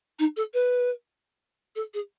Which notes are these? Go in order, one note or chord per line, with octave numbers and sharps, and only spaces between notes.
D#4
A4
B4
A4
G#4